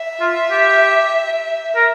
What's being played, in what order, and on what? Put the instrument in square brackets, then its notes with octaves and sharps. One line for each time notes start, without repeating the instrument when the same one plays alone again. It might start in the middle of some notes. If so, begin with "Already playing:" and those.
Already playing: [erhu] E5
[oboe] F4
G4
A#4